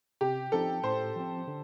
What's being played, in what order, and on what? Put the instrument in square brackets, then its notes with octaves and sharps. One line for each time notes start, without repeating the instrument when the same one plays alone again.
[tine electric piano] C3 [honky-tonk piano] G4
[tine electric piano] F3 C4 D#4 [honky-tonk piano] A4
[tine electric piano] A2 [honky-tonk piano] C5
[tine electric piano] F3 C4
D3